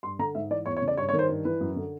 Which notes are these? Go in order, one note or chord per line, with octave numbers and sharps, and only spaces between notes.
G2 C6
D3 A#5
G#2 E5
E3 D5
E2 C#5
C#5
C#3
D5
G2 C#5
C#5
D#3
C5
G2
E3 B4
F#2
D3